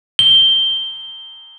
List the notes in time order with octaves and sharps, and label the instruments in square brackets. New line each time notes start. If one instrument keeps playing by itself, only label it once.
[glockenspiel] G7